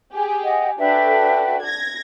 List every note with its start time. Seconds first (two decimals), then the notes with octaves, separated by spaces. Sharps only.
0.13 G4 G#4
0.43 D#5 F#5
0.79 D4 F#4 A4 B4 E5 G5
1.62 G#6 A#6